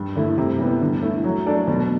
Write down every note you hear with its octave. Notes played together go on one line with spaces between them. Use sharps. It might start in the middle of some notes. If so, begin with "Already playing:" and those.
Already playing: G2
D3 A3 E4
C3
E3 G3 B3
D3
A3 E4
F#3
A3 D4 A4 D5
B2